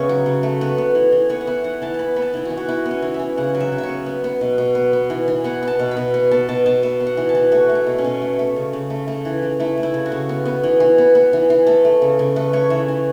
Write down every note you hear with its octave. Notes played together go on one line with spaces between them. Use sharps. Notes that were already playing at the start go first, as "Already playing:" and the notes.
Already playing: C#3 B3 C#5 E5
F#3
C#3
A3
B3 B4
B3
E3
E3
B3 C#5
F#5
B3 E5
E3 F#5
E3 A5
B3 A5 B5
B3 B5
A5
E3 E4
F#4
E3
F#4
B3 E4
B3
C#4
E3
E5
E3
C#3 F#5
F#3
E5
C#3
E5
C#5
B3
B3
B3
B2
B2
B3
B3
E3
E3
B3 F#5
B3 A5
B2
B5
B2
B3
B3 A5
B2 A5
B2 A5
B3 E5
B3
F#5
E3
A5
E3
A3 F#4
A3
E4
B2
C#4
B2
A3
A3
C#3
C#3
A3
A3
E3
E3
A3 E4
A3
E4
C#3
F#4
C#3
B3
B3
E3
E3
B3
B3
E3
E3
A3 A4
A3
C#3
C#3
A3 B4
A3 C#5
E3 E5
E3